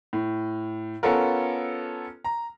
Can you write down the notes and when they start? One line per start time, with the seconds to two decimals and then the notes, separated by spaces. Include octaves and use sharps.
0.13 A2
1.03 B3 C#4 F4 A4 A#4
2.25 A#5